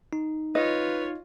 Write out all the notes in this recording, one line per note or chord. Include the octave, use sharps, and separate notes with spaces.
D#4
F4 B4 C#5 D#5